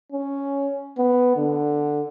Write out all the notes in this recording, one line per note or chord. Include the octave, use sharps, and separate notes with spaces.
C#4
B3
D3